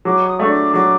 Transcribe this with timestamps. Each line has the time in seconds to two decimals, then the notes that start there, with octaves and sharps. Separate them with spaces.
0.05 F#3 D6
0.28 D#6
0.40 A3 D4 C#6
0.51 D6
0.74 F#3 D6